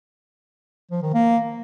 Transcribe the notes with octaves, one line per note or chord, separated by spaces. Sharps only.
F3
D#3
A#3